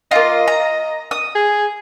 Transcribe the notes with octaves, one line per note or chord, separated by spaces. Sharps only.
A#3 F4 D#5
A#5
D#6
G#4